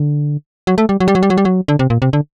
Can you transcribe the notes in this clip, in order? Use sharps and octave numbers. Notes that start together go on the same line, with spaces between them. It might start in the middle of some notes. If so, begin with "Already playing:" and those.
Already playing: D3
F#3
A3
G3
F#3
G3
F#3
G3
F#3
G3
F#3
D3
C3
A#2
C3
D3